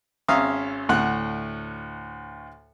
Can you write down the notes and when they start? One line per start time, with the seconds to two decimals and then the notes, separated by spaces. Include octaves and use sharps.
0.28 G#1 C#4 E5 F5 A#5 D#6
0.89 D2 A2 F#5 F#6